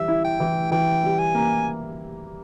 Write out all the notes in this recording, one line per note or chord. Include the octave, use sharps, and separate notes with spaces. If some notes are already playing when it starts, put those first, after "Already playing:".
Already playing: E3 G3 E5
E4
G5
E3
E3 G5
G3
G#5
A#3